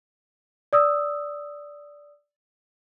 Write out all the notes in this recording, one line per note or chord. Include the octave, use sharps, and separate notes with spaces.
D5 D#6 E6